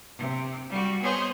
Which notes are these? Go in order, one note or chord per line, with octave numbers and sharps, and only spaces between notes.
C3
G3 F#4
B3 G#4 C5 C#5 D#5